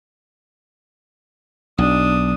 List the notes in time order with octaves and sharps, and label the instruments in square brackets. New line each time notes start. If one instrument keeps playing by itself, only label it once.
[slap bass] B1 [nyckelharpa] D4 D#6